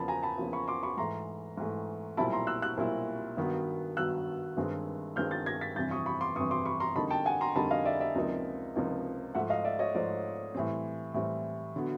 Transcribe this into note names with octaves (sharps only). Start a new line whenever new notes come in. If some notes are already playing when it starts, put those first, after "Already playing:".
Already playing: E2 C#3 F3 A#3 A5 B5
G#5 A#5
A5 B5
E2 C#3 F3 A#3
B5 C#6
C6 D6
B5 C#6
G#2 E3 A3 A#5 C6
G#2 E3 A3
B1 A#2 G3 C4 E4 A5 B5
A#5 C6
E6 F#6
E6 F#6
B1 A#2 G3 C4 E4
G2 D#3 F#3 B3
G2 D#3 F#3 B3 E6 F#6
G1 G2 D#3 G#3 C4
G1 G2 D#3 G#3 C4 F6 G6
G6 A6
G#6 A#6
A6 B6
G1 F2 C3 E3 G6 A6
C#6 D#6
B5 C#6
C6 D6
G1 F2 C3 E3 C#6 D#6
C6 D6
B5 C#6
A#5 C6
F2 D3 G3 A#3 D#4 A5 B5
G5 A5
F#5 G#5
A#5 C6
F2 D3 G3 A#3 D#4 A5 B5
D#5 F5
D5 E5
D5 E5
C#2 C3 F3 A#3 D#4
C#2 C3 F3 A#3 D#4
G#2 F3 A3 E5 F#5
D#5 F5
D5 E5
C#5 D#5
G#2 F3 A3 C5 D5
A2 E3 G3 C4
A2 E3 G3 C4
D3 F#3 B3